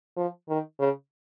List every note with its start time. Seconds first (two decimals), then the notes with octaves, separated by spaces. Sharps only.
0.17 F3
0.49 D#3
0.80 C#3